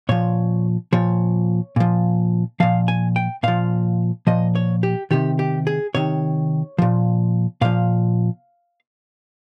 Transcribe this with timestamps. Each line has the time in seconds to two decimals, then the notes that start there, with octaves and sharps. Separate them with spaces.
0.09 A#2 F3 C#5
0.93 A#2 F3 C#5
1.76 A#2 F3
2.60 A#2 F3 F5
2.88 G#5
3.16 G5
3.43 A#2 F3 F5
4.27 A#2 F3 D#5
4.55 C#5
4.83 G4
5.11 C3 D#3 G4
5.39 G4
5.67 G#4
5.94 C3 D#3 C#5
6.78 A#2 F3
7.61 A#2 F3 F5